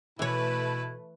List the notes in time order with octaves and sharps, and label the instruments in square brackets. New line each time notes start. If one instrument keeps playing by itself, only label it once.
[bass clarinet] B2 [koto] E3 C#5 [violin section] A3 B4 [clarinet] E4